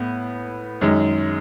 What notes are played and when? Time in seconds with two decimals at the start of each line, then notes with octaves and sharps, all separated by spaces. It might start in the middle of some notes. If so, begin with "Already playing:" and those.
Already playing: A2 B3
0.81 F#2 D#3 G#3